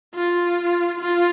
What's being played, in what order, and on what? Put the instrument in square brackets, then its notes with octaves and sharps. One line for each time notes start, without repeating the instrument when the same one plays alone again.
[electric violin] F4
F4